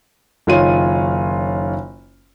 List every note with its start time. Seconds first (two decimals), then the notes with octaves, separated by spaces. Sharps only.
0.47 F#1 D#3 F4 C#5 D#7